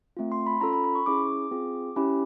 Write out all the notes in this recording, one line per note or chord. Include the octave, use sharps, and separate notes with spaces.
A3 C4 F4
C6
B5
C#4 F4 A4 A#5
B5
B5
C#6
C#4 E4 G#4 D6
C4 F4 G#4
C#4 E4 G4